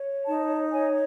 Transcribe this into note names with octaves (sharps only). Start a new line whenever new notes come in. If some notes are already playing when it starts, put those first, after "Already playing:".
Already playing: C#5
D#4 A5
C#5 G#5